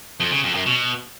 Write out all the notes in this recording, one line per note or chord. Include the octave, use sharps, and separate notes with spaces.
F2
C#3
F2
F#2
B2